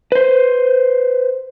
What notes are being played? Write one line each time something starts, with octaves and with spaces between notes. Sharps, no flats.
B4 C5